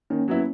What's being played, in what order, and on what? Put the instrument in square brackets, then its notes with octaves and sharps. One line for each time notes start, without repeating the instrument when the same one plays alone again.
[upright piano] D#3 [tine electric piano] A#3 C#4
[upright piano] F#3 B3 E4